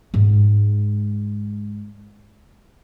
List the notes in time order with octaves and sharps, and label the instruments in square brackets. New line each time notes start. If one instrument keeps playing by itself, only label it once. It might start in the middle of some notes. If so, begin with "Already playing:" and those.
[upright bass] G#2 G#3